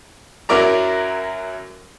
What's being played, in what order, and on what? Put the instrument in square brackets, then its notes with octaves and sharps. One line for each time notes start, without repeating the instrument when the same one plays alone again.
[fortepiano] F#2 F#3 E4 A#4 D5 A#5